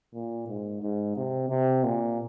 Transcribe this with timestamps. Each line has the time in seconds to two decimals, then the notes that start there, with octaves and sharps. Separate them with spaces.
0.14 A#2
0.48 G#2
0.82 G#2
1.17 C3
1.49 C3
1.84 A#2